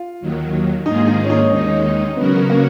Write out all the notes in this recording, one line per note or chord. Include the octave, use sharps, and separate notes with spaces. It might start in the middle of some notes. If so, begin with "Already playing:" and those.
Already playing: F4
D#2 D#3 F#3
G#2 D#3 A#3 D#4 F4 G#4
D#4
C#4
D#4
D#2 D#3 G#3 C#4 D#4
C#3 F#3 B3 C#4 F#4 A#4
A#3